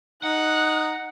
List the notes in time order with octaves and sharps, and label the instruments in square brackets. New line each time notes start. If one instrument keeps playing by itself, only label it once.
[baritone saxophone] D#4 [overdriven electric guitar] F#5 [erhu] F#6